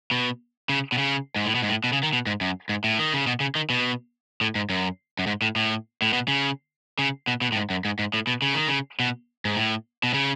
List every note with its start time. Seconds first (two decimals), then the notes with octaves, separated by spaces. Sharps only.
0.11 B2
0.69 C#3
0.92 B2
0.98 C#3
1.36 G#2
1.46 A2
1.55 B2
1.63 G#2
1.69 A2
1.84 B2
1.93 C#3
2.03 D#3
2.13 B2
2.27 G#2
2.41 F#2
2.69 G#2
2.84 A2
2.99 D#3
3.13 C#3
3.27 B2
3.40 C#3
3.55 D#3
3.70 B2
4.41 A2
4.55 G#2
4.70 F#2
5.19 F#2
5.27 G#2
5.42 A2
5.56 A2
6.02 A2
6.13 B2
6.28 C#3
6.99 C#3
7.28 B2
7.41 B2
7.52 A2
7.56 G#2
7.70 F#2
7.85 G#2
7.99 G#2
8.14 A2
8.27 B2
8.42 C#3
8.55 D#3
8.68 C#3
9.00 B2
9.45 G#2
9.56 A2
10.03 B2
10.14 C#3